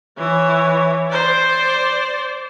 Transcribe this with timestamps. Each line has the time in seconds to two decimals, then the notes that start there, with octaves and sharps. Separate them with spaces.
0.18 E3 C#5
1.11 C5 D5